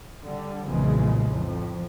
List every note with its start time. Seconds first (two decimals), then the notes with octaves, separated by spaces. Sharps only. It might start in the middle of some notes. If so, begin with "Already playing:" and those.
0.25 D3 G3
0.65 B1 F2 A#2 C#3 E3 G#3
1.28 F2 A2